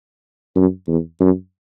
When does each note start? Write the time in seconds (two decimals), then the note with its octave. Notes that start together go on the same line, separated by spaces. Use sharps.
0.56 F#2
0.88 E2
1.20 F#2